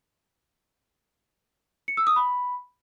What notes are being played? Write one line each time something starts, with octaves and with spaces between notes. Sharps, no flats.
C#7
E6
D#6
B5